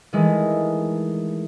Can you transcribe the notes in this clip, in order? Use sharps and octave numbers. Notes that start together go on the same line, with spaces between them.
D#3 E3 G#3 A3